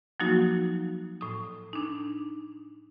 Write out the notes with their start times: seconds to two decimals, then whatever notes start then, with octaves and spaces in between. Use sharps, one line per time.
0.20 F3 F#3 A#3 D#4 F#4
1.21 A2 D#6
1.73 D4 D#4